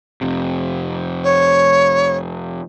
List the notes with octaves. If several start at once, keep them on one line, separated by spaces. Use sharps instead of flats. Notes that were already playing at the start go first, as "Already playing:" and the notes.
F2 C3
C#5